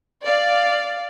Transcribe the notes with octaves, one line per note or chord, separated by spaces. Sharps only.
D5 F5